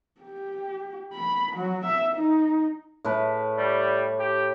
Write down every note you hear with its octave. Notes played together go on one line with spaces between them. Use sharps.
G4
B5
F#3
E5
D#4
A2 A3 B4
G3
G4